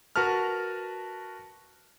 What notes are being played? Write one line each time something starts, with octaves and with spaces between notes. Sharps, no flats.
F#4 A#4 B4 A5 F6